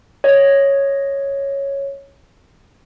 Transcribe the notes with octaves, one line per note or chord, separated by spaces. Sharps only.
C#5 D#5